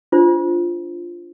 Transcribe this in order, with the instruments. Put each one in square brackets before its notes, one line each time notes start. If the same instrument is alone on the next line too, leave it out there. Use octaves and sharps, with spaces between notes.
[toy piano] D4 F4 C5